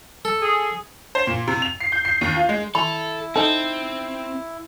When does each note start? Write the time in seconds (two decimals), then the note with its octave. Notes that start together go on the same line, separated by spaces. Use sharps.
0.25 A4
0.42 G#4
1.15 C5
1.27 A#2
1.48 C3
1.62 F7
1.81 C7
1.92 G6
2.05 C7
2.21 D#2
2.36 F4
2.49 G#3
2.75 E4 A4 B5
3.36 C4 D#4 A4